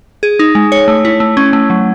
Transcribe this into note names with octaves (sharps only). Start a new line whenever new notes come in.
G#4
D#4
G#3
C#5
A3
E4
A3
C#4
A3
F#3